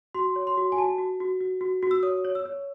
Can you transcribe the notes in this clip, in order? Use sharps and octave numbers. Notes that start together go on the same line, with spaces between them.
F#4 C6
C#5
C6
F#4
G#5
F#4 A5
F#4
F#4
F#4
F#4
F#4
E6
C#5 D#6
C#5
E6
C#5